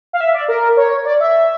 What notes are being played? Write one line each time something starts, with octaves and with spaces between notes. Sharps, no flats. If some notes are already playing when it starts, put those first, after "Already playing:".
F5
E5
D5
A#4
C#5
D5
E5